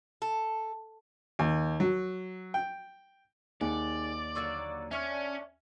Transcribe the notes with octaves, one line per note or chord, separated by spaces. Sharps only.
A4
D#2
F#3
G5
D#2 D#4 G#4 D5 F#5 G#5
D3 F#3 A#3 C#6 E6 A6
C#4 D4 C#5 E5 F6